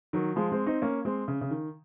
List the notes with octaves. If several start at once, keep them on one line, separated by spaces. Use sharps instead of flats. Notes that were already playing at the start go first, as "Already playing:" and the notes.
D#3 F#3
F3 G#3
G#3 C4
C4 D#4
A#3 C#4
G#3 C4
C#3
C#3
D#3